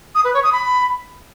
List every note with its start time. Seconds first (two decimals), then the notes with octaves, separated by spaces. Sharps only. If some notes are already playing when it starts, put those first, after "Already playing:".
0.15 D#6
0.24 B4
0.34 C#5
0.43 D#6
0.53 B5